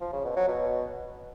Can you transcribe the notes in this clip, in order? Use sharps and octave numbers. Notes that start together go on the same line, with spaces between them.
F3
C#3
B2
F#3
B2